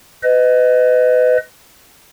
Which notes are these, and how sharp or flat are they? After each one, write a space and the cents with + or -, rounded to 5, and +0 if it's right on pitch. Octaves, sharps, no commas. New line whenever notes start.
B4 +30 D#5 +0